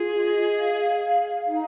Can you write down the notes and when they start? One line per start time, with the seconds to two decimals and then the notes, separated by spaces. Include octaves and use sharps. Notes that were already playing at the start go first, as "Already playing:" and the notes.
Already playing: F4 G#4
0.14 D#5
0.58 F5
1.03 F5
1.47 D#4